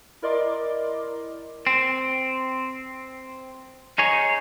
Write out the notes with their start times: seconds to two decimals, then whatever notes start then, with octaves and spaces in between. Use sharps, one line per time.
0.22 E4 A#4 D5 D#5 C6 D6
1.67 C4
3.98 D#4 G#4 C#5